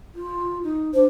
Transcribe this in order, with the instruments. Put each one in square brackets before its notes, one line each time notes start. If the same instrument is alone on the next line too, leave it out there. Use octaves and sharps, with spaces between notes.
[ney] F4
D#4
[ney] D4 [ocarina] C5